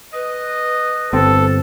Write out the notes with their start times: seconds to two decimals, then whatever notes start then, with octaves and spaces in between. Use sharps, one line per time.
0.13 B4 D#5
1.13 G1 C4 A4